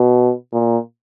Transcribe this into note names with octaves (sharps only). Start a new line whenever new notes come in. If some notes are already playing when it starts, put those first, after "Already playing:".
Already playing: B2
A#2